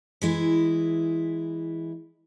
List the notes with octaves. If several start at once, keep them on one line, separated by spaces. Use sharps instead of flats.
E3 G#3 E4